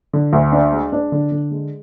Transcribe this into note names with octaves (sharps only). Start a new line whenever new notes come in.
D3
D2
D4
G#3
D4
D3
D3
G#3